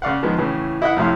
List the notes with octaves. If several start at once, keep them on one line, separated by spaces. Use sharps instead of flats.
C#3 D5 F5 F#5
D#3 F3 G#3 B3
A2 C#3 E3
E4 D#5 E5 F#5
F2 A2 C3 F5